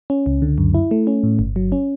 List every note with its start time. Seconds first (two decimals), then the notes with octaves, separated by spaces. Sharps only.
0.10 C#4
0.26 C#2
0.42 D3
0.58 F#2
0.75 E4
0.91 A3
1.07 C#4
1.23 A2
1.39 G1
1.56 F#3
1.72 C#4